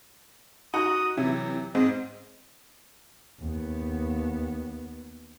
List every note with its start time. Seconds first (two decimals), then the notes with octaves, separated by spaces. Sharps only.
0.74 D#4 F#4 A#5 D#6
1.17 C3 E3 F#3 E4
1.75 G#2 C4 D#5
3.41 D#2 B3